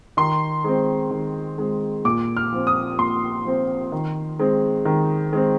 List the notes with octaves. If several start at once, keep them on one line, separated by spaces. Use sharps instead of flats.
D#3 C6
G#3 C4
D#3
G#3 C4
A#2 D6
F6
F3 C4
D#6
A#2 C6
F3 C4
D#3
G#3 C4
D#3
G#3 C4